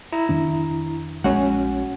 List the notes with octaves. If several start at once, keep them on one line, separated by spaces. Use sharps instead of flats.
E4 A#5
F2 D#3 D4
A#1 G#3 C#4 F#4 F#5